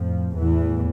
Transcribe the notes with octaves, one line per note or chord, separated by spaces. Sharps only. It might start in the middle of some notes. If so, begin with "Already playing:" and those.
Already playing: F2 A2 F3
E2 A2 E3